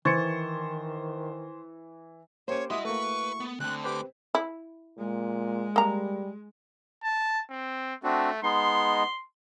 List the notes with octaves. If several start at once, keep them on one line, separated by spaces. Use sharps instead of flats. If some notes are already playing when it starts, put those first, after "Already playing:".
D#3 E3 C5 C#6 G#6 A6 C#7
A#3 C#4 G4 C5 C#5 D6
E4 F#4 D#5 C6 D#6
A3 A#3 B4 C#6
B3
D2 D3 C4 F#6
G4 B4 C5 D6
E4
A#2 G#3
G3 A#3 A#5
A5
C4
A3 C4 D4 F#4
G#3 B3 D#4 C6